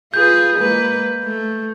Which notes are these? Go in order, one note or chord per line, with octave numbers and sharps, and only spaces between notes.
F4 G#4 B4 G6
G#3 A#3 B4
A3